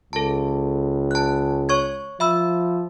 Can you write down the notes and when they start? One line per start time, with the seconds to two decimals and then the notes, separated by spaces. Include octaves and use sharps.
0.13 C#2 A4 A5
1.11 A5 F#6
1.69 C#5 C#6 G#6
2.20 F3 E5 B5 E6